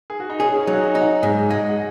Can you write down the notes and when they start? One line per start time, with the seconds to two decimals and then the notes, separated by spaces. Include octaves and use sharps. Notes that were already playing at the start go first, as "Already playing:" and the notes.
0.10 G#4
0.20 F#4
0.30 D#4
0.40 C#4 G#4
0.56 C#4
0.60 D#4
0.67 F#3
0.73 F#4
0.81 D#4
0.95 D#4
1.01 F#5
1.22 G#2 D#5
1.50 G#3 D#5
1.69 F#5